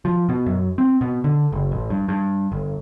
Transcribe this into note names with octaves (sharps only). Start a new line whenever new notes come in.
F3
B2
F#2
C4
B2
D3
F#1
A1
G2
G2
G1